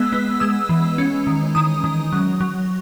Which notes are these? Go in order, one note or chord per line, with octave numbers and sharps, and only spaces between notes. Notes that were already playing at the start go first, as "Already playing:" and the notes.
Already playing: G#3 B3 E6
B3
G#3 E6
E3
C#4
D#3
D#3 D#6
D#3
F#3
F#3